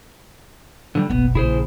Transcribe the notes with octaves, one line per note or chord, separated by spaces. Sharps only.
D3 E3 G3
F#1 B1 B3
A#1 C#3 E4 G#4 C5